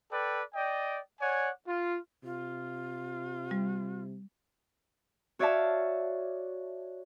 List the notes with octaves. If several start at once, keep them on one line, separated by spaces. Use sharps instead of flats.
A4 B4 D5 G5
D5 D#5 G5
C#5 D5 F#5 G#5
F4
C3 F4
G3
F#4 C#5 D5 E5 F5 A5